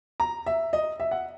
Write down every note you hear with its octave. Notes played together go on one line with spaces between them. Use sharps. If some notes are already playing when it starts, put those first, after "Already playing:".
A#5
E5
D#5
E5
F#5